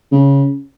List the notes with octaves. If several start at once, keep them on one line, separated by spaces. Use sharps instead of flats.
C#3